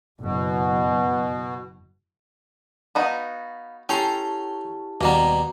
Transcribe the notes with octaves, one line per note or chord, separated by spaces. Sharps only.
F#1 B2
B3 D#4 F#4 F5 B5
C#4 E4 G4 A4 G5 A5 A#5 C6
D#2 B2 G3 A#3 B3 A#5